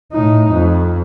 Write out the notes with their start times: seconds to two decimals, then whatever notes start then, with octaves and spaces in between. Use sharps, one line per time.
0.12 A2 D#4
0.52 F2